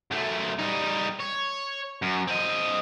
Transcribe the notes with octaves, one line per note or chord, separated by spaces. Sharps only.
F#2 A3
G3 D#4
C#5
F#2
C4 D#5